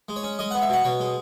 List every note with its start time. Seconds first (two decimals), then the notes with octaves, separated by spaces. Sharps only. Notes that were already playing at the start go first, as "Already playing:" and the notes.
0.09 G#3
0.16 C#5
0.23 C#4
0.39 G#3 D#5
0.51 B3 F#5
0.62 E5
0.69 B2 F#5
0.84 B2 C#5
1.00 G#3